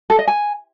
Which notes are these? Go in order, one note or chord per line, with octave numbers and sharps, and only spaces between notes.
A4
D#5
G#5